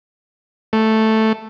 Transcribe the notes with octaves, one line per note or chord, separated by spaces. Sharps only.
A3